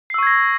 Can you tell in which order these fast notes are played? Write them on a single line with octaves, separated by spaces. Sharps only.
C7 E6 C#6 G#6 A#6